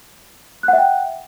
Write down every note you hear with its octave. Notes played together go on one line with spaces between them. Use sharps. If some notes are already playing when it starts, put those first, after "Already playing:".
E5 F#5 G5 F#6